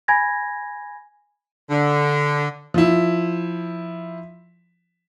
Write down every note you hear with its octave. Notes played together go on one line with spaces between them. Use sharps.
G#5 B5 G#6 A#6
D3
F3 E4